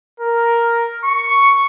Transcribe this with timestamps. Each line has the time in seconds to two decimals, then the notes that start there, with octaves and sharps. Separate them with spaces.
0.20 A#4
1.05 C#6